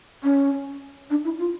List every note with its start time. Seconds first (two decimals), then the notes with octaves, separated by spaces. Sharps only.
0.23 C#4
1.10 D4
1.25 E4
1.39 F4